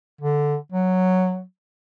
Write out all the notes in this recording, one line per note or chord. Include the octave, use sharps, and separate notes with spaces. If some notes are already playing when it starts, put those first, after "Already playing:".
D3
F#3